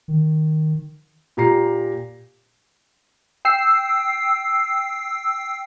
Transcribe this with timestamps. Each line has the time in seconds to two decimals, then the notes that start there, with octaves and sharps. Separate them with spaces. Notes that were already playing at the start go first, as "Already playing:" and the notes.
0.08 D#3
1.37 A#2 G4 A#5 C7
3.45 G5 E6 C7